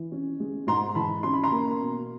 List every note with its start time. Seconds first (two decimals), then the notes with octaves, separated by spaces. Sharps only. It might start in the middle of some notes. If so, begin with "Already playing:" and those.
Already playing: E3
0.12 C#4
0.40 G#3
0.67 G#2 A#5 C6
0.95 E3 A5 B5
1.23 C#4 C6
1.34 B5
1.44 A#5 C6
1.51 A#3
1.80 B2